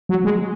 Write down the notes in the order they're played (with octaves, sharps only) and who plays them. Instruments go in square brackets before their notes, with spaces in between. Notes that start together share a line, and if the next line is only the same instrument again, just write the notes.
[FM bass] F#3
G#3